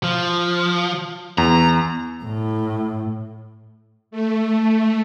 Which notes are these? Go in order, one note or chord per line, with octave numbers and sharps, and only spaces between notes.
F3
E2 A#5
A2
A3